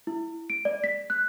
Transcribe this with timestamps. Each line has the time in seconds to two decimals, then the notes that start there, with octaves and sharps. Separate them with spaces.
0.07 E4
0.50 D7
0.65 D5
0.84 B6
1.10 F#6